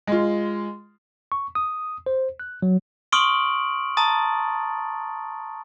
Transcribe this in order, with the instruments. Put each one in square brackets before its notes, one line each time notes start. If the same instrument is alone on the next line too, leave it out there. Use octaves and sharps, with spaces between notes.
[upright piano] G#3 F4
[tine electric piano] C#6
D#6
C5
F#6
F#3
[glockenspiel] C6 C#6 D#6 F6 D7 F#7
A5 A#5 D#6 A6